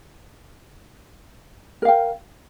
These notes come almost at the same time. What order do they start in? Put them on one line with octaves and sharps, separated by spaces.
A#4 F5 G5